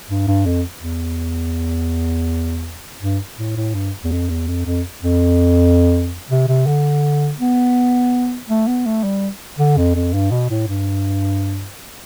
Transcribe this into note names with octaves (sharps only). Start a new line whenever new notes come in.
G2
G2
F2
E2
G2
A2
A2
G2
E2
F2
E2
F2
F2
F2
C3
C3
D3
B3
A3
B3
A3
G3
D3
F2
F2
G2
B2
A2
G2